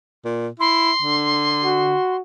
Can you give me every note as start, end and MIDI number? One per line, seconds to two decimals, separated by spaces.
0.25 0.48 46
0.60 0.91 64
0.60 2.16 84
1.02 1.95 50
1.63 2.21 66